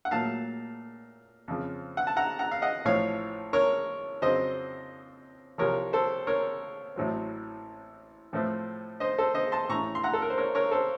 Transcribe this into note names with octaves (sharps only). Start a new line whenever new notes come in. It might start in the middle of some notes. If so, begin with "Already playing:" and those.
F#5
A#2 F#3 A3 F5 A5
F2 C#3 F3
F#5
A5
F#5 A#5
F#5 A#5
F5
D#5 F#5
A1 A2 F3 C4 C#5 F5
A#4 C#5
F2 C#3 F#3 C4 C5 D#5
C2 C3 F3 A#4 C#5
A4 C5
A#4 C#5
A1 A2 F#3 C4
A2 F3 A3 C4
C5 D#5
A4 C5
C5 D#5
A5 C6
A1 A2 A3 C#4 A#5 C#6
C6
F#5 A#5
A4
A#4
C5
A#4 C#5
A#4 C#5
A4 C5